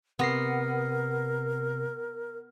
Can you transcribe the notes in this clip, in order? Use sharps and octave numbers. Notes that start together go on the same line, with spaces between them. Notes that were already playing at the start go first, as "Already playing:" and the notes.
C3 B3 A#4 A#6 C7